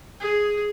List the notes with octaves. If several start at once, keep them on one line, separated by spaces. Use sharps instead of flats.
G#4